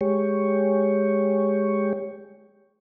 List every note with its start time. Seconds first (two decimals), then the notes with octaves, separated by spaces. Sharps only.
0.01 G#3 G4 C#5